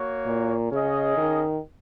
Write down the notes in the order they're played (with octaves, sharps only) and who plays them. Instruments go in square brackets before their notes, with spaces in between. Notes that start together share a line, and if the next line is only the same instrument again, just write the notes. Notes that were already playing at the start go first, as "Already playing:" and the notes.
Already playing: [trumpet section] A#3 F#4 C#5
[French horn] A#2
[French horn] C#3 [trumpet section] C#4 G#4 D#5
[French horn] D#3